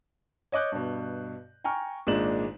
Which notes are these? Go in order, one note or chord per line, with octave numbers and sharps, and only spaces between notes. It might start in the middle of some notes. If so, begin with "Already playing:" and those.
C#5 D#5 D6 F#6 G6
G2 B2
G5 G#5 A#5 C#6 F6
G#1 A#2 G#3 D4 E7 F#7